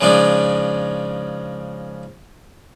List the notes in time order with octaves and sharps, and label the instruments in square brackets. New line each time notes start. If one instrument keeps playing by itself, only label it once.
[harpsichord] C#3 F3 G#3 D4 D#4